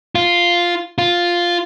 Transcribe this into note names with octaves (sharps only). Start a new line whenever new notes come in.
F4
F4